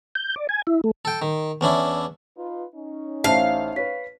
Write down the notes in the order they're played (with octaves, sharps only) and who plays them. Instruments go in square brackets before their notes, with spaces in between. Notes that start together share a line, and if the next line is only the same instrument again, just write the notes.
[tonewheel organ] G6
D5
G#5
E4
A3
[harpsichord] A4 G5
D#3
E2 C#4 D4 E4
[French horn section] D#4 F4 B4
C#4 D#4
[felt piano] A1 A3 [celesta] C5 E5 A5 [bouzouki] F5
[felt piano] B4 C#5 [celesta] B6